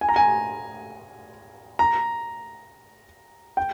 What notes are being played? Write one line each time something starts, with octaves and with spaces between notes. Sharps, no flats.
G#5
A#5
G#5
A#5
G5